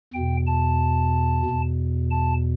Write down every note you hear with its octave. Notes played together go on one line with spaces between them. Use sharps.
E2 B2 G5
A5
E2 B2
A5